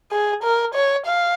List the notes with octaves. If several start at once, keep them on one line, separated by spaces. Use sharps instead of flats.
G#4
A#4
C#5
F5